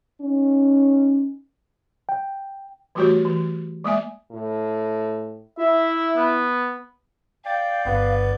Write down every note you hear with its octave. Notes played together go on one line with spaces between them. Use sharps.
C#4 D#4
G5
E3 G3 A3 F#4 G4 C#5
E3
G#3 A#3 E5 G#5
A2
E4 E5
B3
D5 F5 G5
G1 G2 B3 B4